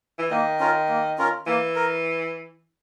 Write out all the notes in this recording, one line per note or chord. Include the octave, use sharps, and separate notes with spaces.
E3
D#3 A#3
C#4 F4 A#4
A#3
C#4 F4 A#4
E3 A#3
A#4